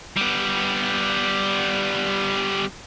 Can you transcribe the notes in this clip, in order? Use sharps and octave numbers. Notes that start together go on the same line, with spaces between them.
G3 B3